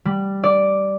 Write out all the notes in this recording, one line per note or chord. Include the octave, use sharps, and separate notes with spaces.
G3
D5